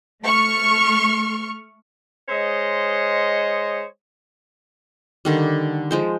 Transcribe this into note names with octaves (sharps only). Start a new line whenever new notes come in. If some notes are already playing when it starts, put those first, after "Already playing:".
A3 C#6 F6
G#3 C5 C#5 D#5
D3 D#3 G3
F3 G#3 C5